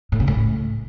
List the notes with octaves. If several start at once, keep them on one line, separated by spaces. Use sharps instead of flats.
A2
C#3
A2